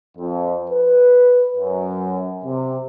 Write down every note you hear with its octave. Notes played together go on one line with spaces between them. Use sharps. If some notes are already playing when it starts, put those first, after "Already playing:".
F2
B4
F#2
C3